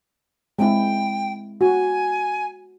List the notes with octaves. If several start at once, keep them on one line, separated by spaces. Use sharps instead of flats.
G#3 C4 E4 G5
F#4 G#5